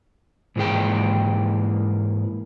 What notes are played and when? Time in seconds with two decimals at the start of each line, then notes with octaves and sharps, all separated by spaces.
0.56 G#2 E3 A#3 G#4 G5